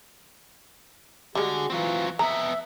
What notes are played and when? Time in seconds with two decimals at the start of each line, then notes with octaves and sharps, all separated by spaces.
1.35 D3 G3 G#3 F#4 G#4
1.70 E3 F#3 C4 F4
2.19 F2 B3 E5 A#5